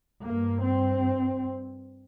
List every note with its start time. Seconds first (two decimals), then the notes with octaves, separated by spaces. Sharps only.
0.23 G2 A#3
0.62 C4